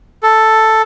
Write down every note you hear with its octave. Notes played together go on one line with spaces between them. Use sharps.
A4